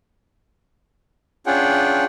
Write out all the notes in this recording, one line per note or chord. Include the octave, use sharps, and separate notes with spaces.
C#4 D4 F4 G#4 F#5 G5